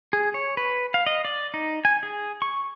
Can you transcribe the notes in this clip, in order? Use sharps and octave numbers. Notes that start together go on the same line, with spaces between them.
G#4
C#5
B4
F5
D#5
D5
D#4
G#5
G#4
C#6